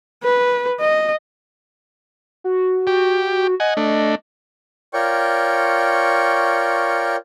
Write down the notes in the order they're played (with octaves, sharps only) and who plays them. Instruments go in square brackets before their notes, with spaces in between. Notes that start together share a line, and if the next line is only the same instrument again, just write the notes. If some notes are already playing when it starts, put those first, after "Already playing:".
[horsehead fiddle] B4
D#5
[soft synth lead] F#4
[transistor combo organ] G4
[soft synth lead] D#5 [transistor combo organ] F#5 G#5
[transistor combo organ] A3 D4
[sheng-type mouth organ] F4 A#4 C#5 D5 G5 C#6